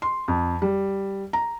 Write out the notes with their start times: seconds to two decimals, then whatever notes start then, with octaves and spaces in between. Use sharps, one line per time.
0.02 C6
0.28 F2
0.62 G3
1.33 A#5